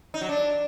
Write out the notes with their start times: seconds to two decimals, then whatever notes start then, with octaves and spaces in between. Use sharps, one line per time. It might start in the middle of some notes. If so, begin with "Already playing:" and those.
0.14 D#4
0.21 F#3
0.29 D4